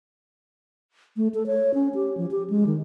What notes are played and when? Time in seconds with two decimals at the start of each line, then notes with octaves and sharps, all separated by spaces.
1.17 A3
1.34 A4
1.47 C#5
1.74 C#4
1.95 G4
2.17 F3
2.31 G4
2.50 G#3
2.66 D#3